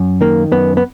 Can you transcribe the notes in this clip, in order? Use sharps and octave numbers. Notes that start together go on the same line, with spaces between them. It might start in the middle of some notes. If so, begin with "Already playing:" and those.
Already playing: F#2
D#3 A#3
F#2 B3
B3